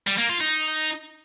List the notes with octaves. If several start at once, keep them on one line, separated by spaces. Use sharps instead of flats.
G3
A#3
F4
D#4